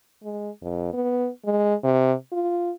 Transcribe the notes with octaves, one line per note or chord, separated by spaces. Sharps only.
G#3
F2
B3
G#3
C3
F4